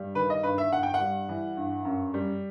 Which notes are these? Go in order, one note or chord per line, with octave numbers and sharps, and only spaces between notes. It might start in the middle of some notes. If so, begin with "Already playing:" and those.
Already playing: G2 G3
D#3 B4
D#5
G2 B4
E5
G2 F#5
G5
F#5
G3
E3
G2
F#2
G3